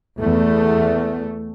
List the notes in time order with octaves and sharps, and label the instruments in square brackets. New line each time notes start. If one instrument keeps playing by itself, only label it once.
[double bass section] E2 A3